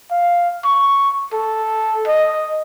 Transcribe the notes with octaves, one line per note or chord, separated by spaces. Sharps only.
F5
C#6
A4
D#5